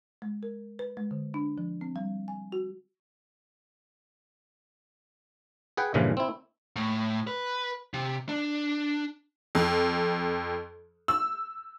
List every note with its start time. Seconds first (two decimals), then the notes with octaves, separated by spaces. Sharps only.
0.22 G#3
0.43 A#4
0.79 B4
0.97 G#3
1.11 D3
1.34 D4
1.58 F3
1.81 C4
1.96 G3
2.28 G#5
2.52 F#4
5.77 G#4 B4 F#5 G5
5.94 G2 A#2 C#3 E3 F3
6.17 C4 E4
6.76 A2
7.27 B4
7.94 C3
8.29 D4
9.55 F2
11.08 E6